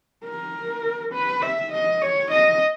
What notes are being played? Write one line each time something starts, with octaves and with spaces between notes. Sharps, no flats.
A#4
B4
E5
D#5
C#5
D#5